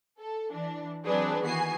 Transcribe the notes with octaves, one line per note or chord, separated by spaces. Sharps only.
A4
E3 D4
E3 F#3 C4 D4 G#4 B4
D#3 E3 B3 F#4 G#5 C7